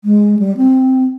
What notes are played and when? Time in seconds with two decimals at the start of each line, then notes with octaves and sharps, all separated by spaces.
0.04 G#3
0.39 G3
0.57 C4